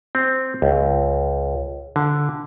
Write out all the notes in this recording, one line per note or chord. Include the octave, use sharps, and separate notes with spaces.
C4
C#2
D3